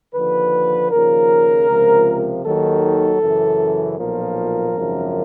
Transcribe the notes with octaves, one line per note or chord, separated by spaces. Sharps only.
D#2 D3 F3 B4
D#2 C#3 F3 A#4
C#2 C3 F3
D#2 D#3 F#3 A4
F#2 C#3 E3
B1 A#2 F3 A#4
G#1 F#2 C#3 F3